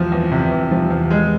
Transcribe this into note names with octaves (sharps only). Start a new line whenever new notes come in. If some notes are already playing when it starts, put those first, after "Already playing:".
Already playing: E2 C3 F3
E2
C3
E2
F3
E2
G#3